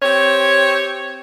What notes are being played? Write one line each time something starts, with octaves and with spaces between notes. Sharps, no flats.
C4 G4 C#5